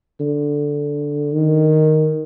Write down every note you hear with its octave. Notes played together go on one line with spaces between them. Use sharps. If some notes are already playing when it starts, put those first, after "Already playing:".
D3
D#3